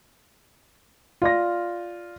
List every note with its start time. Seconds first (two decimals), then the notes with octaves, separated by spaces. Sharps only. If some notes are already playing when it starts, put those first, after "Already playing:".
1.22 F4 D5 A#6